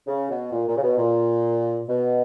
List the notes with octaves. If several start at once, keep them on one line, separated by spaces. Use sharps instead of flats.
C#3
B2
A#2
A#2
C#3
B2
A#2
B2